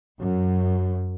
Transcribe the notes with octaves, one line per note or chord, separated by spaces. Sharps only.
F#2